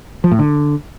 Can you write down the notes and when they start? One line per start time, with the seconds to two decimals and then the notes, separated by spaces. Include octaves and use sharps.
0.24 F3
0.31 A2
0.39 D3